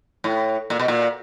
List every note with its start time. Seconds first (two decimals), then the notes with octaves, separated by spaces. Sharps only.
0.24 A2
0.70 A#2
0.79 B2
0.88 A#2